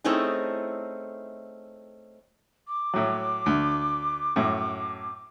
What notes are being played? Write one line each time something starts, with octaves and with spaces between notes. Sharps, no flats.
A3 C4 C#4 D#4 E4 G#4
D6
A2 F#3
D2
F#2 A2